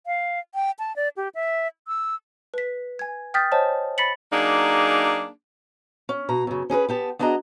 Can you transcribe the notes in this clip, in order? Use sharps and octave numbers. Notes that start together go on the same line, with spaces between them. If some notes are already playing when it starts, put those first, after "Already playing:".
F5
G5
A5
D5
G4
E5
E6
B4 B6
G#5 G#6
G5 D#6 F6 G6 A6 B6
C5 C#5 D#5 G#5 A5
B5 A6 B6 C#7 F#7
F#3 A#3 D4 D#4 G#4
C#4
B2 A#5
F#2 C#3
C#4 G#4 A#4 B4
B3 G4 A5
B3 D4 F#4 G#4 D#5 A#5